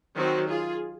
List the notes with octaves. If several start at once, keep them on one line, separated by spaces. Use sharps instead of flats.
D#3 F#3 C4 F#4
F4 G#4